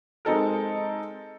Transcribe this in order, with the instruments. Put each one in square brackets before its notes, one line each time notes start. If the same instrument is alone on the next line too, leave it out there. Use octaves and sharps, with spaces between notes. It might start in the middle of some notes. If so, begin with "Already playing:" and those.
[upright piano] G#3 C4 D#4 A4 A#4